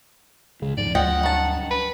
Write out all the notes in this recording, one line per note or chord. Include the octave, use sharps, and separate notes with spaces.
C#2 C#3 G#3
D#2 G#2 F3 B3 D5
D2 G2 F#3 F4 D#5 F#5 G5
D#3 A5
B4